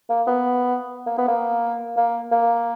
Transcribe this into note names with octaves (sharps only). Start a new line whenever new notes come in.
A#3
B3
A#3
B3
A#3
A#3
A#3